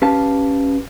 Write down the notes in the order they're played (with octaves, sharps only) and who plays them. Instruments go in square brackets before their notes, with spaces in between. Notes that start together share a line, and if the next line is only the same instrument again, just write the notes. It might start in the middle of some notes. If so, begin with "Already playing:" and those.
[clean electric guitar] C#4 G4 B4 F5 A5